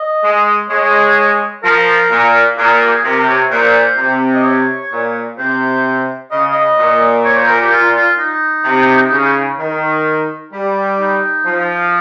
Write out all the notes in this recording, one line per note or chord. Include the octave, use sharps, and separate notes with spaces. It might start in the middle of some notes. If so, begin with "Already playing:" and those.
Already playing: D#5
G#3
G#3 C#5
F3 A#4
A#2
A#2 G#4
G4
G#4
C3 A#4
C#5
A#2 C5
C3
D#5
C#5
A#2
C3 C5
C#3 D#5
D#5
A#2
C#5
C5
A#4
G4
F4
F4
D#4
C3
C#3
D#3
G3
D#4
F3